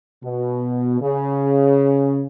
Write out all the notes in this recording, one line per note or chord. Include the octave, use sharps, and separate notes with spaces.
B2
C#3